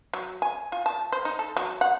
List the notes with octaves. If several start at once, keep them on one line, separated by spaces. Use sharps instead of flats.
F#3
G#5
F4
A5
C5
D#4
A4
F#3
F#5